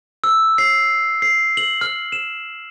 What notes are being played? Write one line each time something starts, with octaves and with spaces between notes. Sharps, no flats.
E6
C7
C7
F#7
F6
E7